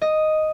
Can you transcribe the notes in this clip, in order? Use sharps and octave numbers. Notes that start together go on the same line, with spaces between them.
D#5